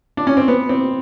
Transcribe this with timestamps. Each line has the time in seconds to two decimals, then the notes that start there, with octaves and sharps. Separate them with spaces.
0.17 D4
0.27 C#4
0.37 C4
0.48 B3
0.69 C4